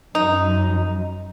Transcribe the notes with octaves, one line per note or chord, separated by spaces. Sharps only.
F#2 D#4